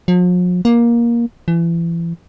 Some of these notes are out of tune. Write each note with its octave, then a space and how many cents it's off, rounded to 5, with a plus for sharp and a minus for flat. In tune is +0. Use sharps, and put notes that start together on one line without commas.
F3 +45
A#3 +15
E3 +35